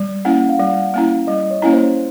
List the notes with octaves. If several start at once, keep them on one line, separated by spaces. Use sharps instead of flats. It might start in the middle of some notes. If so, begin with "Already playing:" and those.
Already playing: G3
A#3 C#4 E4 F#5
F5
G3 F#5
A#3 C#4 E4 F5
G3 D#5
C#5
A#3 C#4 E4
C5